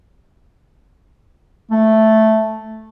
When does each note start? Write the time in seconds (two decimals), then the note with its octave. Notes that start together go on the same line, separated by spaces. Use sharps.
1.71 A3